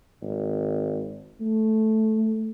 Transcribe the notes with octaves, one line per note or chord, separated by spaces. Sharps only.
G#1
A3